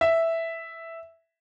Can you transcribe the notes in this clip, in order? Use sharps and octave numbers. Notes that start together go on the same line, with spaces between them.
E5